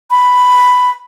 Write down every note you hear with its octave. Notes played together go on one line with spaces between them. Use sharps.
B5